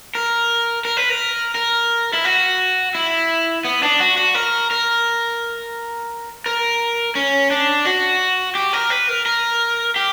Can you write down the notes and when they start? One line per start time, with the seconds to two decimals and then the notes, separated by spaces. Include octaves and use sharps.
0.15 A#4
0.85 A#4
0.97 B4
1.10 A#4
1.55 A#4
2.13 E4
2.25 F#4
2.95 E4
3.65 B3
3.83 D4
4.00 F#4
4.17 F#4
4.35 A#4
4.71 A#4
6.46 A#4
7.15 C#4
7.51 D4
7.85 F#4
8.55 G4
8.73 A#4
8.90 B4
9.09 A#4
9.26 A#4
9.96 G4